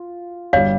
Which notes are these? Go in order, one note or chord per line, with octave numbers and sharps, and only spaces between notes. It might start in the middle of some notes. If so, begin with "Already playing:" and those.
Already playing: F4
G1 G3 C#5 F5